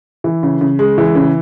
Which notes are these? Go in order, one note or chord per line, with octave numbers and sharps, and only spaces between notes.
E3
C#3
C#3
G#3
E3
C#3